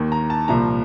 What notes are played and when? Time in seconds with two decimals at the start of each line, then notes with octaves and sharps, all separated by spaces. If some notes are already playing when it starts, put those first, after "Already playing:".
Already playing: D#2 D#3
0.12 A#5
0.30 A5
0.48 C2 A#2 F3 A#5